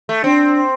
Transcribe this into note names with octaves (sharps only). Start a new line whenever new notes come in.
A3
C4 D4